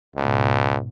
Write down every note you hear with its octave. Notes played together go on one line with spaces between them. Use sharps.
C#2 G#2 B2